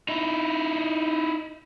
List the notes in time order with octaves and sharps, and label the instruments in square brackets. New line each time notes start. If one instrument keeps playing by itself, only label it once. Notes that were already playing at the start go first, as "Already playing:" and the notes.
[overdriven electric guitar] D#4 E4